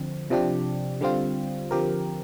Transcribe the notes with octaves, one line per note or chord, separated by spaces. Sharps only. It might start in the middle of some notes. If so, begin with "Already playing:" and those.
Already playing: D3 F3 C4
C3 F3 D4 G4
D3 G3 C4 F4
D3 F3 C4 G4 A#4